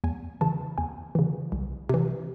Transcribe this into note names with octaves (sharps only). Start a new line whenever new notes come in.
E2 G#5
C#3 E3 A5
E2 G#5
C#3 E3
C2
C3 E3